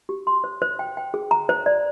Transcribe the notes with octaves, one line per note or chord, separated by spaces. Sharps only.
G4
C6
C5
C5
G5
G5
G#4
A#5
C5
D5